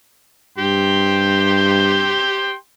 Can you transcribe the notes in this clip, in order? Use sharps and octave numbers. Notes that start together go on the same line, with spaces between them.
G2 G4 G5 C6